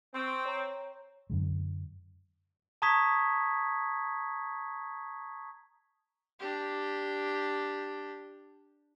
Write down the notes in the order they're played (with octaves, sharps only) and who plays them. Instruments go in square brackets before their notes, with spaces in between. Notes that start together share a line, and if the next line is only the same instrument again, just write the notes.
[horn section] C4 [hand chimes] C6 C#6 E6
[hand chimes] C#5 A#5
[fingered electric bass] F#2 D3 G#3
[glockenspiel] A5 A#5 C#6 D#6 G#6 B6
[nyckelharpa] D4 G4